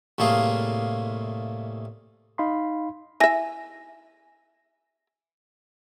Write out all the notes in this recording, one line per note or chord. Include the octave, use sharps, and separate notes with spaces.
C2 A2 A3 A#3 G#4 F5
D#4 F5 B5 C6
E4 E5 G#5 A#6